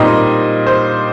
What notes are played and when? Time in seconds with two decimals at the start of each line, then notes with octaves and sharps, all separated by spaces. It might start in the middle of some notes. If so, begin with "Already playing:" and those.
Already playing: A#2 G3 C4 D#4 D#5
0.67 C5